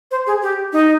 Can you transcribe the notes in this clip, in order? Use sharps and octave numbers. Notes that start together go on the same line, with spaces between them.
C5
G#4
G4
D#4